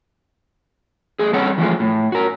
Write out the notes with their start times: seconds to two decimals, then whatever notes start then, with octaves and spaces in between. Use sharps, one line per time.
1.19 A3 G#4
1.33 G3 C4 A4 C#5 F#5
1.58 E3 F3 G#3 A3
1.80 A2
2.12 F#4 A#4